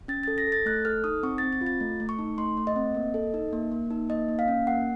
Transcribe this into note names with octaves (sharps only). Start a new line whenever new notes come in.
C#4 A6
A4 A6
A#6
A4
A6
A3 F#6
A4 F6
D#4 D#6
C4 C#6
C4 A6
A6
F4
A6
A3
A3
C#6
D#4
A3 C6
A3
D#5
C4
A#3
A4
D#4
A#3
A#3
D#4
A#3 D#5
A#3
F5
C#4
A#3 F#5